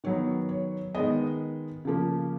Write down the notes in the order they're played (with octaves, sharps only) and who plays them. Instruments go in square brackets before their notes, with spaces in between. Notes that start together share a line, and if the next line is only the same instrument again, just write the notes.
[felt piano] D#3 F#3 B3 C#5
C#5
D#3 G#3 B3 D#5
C#3 F3 A#3